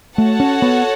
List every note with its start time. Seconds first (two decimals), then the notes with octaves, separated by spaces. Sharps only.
0.18 A3 F#4 A4 C#5 F#5 A5
0.40 C#4
0.62 B3